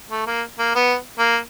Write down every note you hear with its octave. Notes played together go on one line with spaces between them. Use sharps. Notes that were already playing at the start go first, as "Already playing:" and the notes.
A3
A#3
A#3
B3
A#3